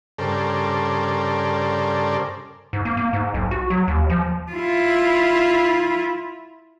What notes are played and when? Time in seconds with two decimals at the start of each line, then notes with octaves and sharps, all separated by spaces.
0.19 G2 C#3 A4 A#4 C5 D5
2.73 G#2
2.85 A#3
2.97 A#3
3.13 G#2
3.34 B1
3.51 F#4
3.70 F#3
3.88 D#2
4.10 F3
4.52 E4 F4